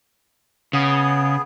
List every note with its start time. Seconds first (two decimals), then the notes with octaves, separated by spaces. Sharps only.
0.73 C#3 B3 G#4